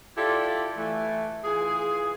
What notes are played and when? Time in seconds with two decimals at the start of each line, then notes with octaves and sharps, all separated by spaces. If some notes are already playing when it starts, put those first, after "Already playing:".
0.17 E4 F4 G4 A4 D5
0.78 E3 A3
1.45 E3 F4 G#4